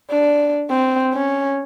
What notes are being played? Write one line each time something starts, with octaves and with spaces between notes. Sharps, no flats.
D4
C4
C#4